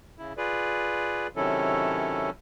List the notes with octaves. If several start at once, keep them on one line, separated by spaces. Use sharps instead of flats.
C#3 E4
F4 G#4 B4 D5
C3 D#3 F#3 C#4 E4 A4